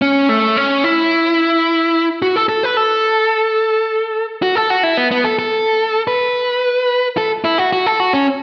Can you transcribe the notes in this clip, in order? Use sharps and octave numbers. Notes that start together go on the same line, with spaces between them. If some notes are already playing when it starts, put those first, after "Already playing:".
C#4
A3
C#4
E4
F#4
A4
A4
B4
A4
F#4
A4
F#4
E4
B3
B3
A4
A4
B4
A4
E4
F#4
F#4
A4
F#4
C#4